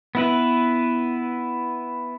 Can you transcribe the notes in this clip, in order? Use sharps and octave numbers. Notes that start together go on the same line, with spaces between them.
B3 E4 B4